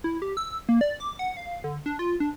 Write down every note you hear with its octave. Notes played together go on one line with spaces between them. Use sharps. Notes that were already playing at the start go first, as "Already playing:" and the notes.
E4
G4
E6
A#3
D5
D6
F#5
F5
D3
D4
F4
D4